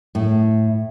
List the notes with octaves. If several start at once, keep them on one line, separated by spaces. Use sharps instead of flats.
A2